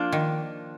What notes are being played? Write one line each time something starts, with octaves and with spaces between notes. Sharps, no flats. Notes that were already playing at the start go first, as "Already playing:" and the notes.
Already playing: F3 A#3 D4 F4
D#3